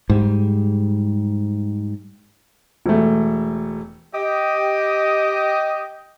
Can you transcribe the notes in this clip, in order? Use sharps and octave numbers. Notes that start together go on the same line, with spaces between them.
G#2 G3
E1 A3
G4 D#5